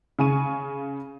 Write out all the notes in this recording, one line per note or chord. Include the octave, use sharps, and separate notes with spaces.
C#3 G#5 C#6 D#7